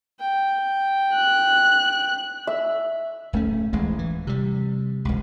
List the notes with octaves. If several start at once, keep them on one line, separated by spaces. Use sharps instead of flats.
G5
F#6
E5
D1 A3 C#4
D1 A1 E3 G#3
E3
C3 G3
E1 C#2